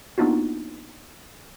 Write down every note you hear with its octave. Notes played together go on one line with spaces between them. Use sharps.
A#3 B3 D4 D#4 F4 F#4